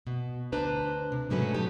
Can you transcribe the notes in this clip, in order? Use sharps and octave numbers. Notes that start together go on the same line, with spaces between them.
B2
D2 D4 B4 C5 A#5
C3
G#2 B2 F#3 A3 C#4 B4
B3 D#4 G4 A4